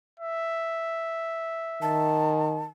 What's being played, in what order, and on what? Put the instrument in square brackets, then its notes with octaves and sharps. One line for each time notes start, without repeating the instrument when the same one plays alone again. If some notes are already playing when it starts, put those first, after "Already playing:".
[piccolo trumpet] E5
[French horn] D#3 [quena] A5